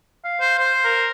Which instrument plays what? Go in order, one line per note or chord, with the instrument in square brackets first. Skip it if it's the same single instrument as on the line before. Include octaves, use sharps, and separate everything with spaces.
[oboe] F5
[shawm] C5
C5
[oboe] A#4